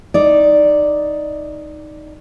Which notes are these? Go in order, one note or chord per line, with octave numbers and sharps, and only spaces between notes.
D#4 D5